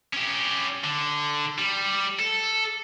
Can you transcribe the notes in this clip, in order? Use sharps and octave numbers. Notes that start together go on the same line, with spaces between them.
C#4 G4
D3
G3
A4